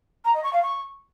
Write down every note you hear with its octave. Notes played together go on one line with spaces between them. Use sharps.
A#5
D#5
C#6
F5
C#6